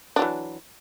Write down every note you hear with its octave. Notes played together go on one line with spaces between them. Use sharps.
E3 F#3 D4